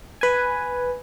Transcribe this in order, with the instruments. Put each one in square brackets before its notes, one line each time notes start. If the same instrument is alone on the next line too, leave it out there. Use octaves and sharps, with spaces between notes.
[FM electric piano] B4 G#5